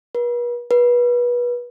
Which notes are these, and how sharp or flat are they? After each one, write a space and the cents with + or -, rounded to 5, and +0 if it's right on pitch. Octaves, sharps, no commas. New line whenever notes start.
B4 -45
B4 -30